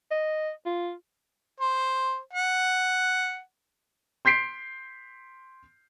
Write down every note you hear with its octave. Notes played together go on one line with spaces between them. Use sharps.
D#5
F4
C5
F#5
C6 G6 B6 C7 D7